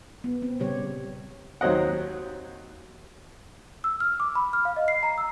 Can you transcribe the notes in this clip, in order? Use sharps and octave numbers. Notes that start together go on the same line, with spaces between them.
B3
C4
A#2 C#3 G3 G4 C#5
D#2 F#3 C4 D#5 F#5
E6
F6
D6
B5
F6
F5
D#5
C7
A#5
E6